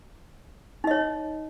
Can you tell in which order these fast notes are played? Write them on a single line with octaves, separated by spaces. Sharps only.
D#4 D#5 C#5